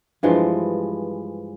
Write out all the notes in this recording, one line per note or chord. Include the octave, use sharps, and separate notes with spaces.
G2 E3 F3 G#3